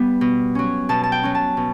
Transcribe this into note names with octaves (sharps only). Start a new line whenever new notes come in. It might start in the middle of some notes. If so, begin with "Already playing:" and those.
Already playing: G3 B3 B4
B2
F#3 C#4
B2 A5
A5
G5
F#3 C#4
A5
B2